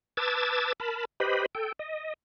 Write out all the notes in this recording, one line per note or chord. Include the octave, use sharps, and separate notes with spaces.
B4 A5 D6 E6 G#6 A6
A#4 A5 B5
G4 B4 C5 D#5 B5
A4 G5
D#5